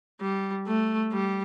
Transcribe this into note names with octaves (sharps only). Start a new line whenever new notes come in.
G3
A3
G3